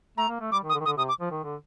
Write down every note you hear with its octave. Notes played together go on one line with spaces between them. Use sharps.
A3 A#5
A#3
A3
G3 D6
D#3
D#6
D3
D#3
D3 D#6
C3 D#6
D6
F3
D#3
D3